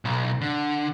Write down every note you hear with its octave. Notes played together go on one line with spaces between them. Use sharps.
B1
D3